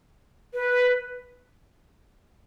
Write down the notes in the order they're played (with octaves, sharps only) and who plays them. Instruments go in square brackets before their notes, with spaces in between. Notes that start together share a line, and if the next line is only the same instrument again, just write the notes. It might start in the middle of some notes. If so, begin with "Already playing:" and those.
[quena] B4